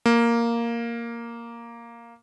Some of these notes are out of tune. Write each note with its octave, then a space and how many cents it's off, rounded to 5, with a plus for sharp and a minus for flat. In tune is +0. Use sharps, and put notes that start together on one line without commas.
A#3 +0